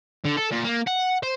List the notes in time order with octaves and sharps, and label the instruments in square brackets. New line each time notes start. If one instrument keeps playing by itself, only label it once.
[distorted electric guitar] D3
A4
A#2
A#3
F#5
C5